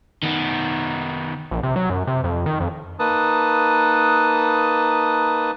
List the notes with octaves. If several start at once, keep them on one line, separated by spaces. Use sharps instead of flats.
D#3 B3
A#1
C3
F#3
F#2
C3
F2
D#3
F2
A#3 D#4 B4 A5 D#6